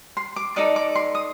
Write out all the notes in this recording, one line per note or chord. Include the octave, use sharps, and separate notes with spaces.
C6
D6
D#4 A4 D5 D#6
D6
C6
D#6